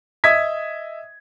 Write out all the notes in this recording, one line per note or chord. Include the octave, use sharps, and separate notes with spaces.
D#5 E5 D#6 G#6 B6